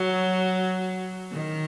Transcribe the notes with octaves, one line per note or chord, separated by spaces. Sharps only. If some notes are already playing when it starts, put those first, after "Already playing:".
Already playing: F#3
D#3